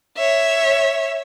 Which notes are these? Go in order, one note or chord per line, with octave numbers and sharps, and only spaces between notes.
C#5 E5